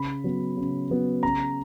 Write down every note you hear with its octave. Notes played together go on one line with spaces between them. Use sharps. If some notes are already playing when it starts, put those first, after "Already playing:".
Already playing: C#3 B5
F#3 B3
C#3
F#3 B3
C#3 A#5